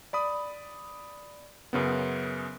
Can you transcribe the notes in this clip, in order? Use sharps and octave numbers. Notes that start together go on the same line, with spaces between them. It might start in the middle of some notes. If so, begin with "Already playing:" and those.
D5 B5 D#6
F#2 C#3 B3